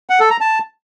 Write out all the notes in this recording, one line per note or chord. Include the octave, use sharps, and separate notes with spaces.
F#5
A4
A#5
A5